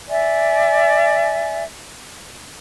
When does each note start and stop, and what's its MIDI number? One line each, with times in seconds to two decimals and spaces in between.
0.09 1.64 74
0.09 1.64 76
0.09 1.64 80